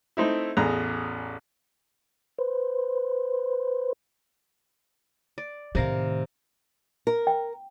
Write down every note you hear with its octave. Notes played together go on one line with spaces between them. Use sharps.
A3 C4 D#4 E4
A1 E2 G#4 A#5
B4 C5
D5
A2 C3 D#3 A#4 F5
A#4
G5